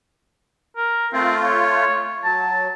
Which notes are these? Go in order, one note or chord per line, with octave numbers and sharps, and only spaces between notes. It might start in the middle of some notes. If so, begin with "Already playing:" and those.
A#4
A3 C4 F4
C#5
F#3 A5